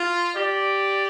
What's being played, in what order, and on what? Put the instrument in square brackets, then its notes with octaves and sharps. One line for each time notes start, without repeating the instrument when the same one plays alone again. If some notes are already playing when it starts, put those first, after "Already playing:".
Already playing: [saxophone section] F4
[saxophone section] G4 [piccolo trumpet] D5